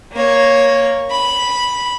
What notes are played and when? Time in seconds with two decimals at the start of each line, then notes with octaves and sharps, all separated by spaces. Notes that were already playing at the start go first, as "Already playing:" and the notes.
0.12 A#3 C#5
1.10 B5